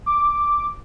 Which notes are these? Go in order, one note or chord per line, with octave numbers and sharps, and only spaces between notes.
D6